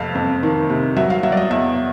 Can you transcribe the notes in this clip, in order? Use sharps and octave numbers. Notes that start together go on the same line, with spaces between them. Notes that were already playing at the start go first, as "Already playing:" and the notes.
Already playing: F2 C3 F5
F2
D#3
C3
F#3 E5
F5
F#3 E5
D5
D#5
E2 E5